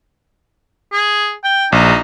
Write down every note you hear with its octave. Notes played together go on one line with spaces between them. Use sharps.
G#4
G5
A#1 D#4